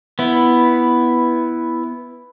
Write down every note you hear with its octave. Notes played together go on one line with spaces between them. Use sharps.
B3 E4